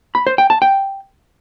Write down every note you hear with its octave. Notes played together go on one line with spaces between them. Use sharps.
B5
C5
G5
A5
G5